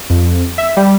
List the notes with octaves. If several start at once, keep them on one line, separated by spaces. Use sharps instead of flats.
F2
E5
G3